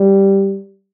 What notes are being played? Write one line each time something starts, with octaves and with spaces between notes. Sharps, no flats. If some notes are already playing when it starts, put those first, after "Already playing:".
Already playing: G3